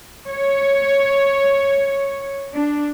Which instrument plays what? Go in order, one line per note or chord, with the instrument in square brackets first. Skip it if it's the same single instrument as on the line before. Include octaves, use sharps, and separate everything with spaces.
[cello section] C#5
D4